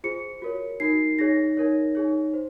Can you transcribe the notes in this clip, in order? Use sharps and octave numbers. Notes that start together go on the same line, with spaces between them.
F4 G#4 C5 C#7
F#4 A#4 C#5
D#4 F#4 A#4 C7
D#4 G#4 C#5 A#6
D#4 A#4 C#5
D#4 G#4 C#5
C5